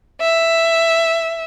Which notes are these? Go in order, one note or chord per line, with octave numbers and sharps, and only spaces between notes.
E5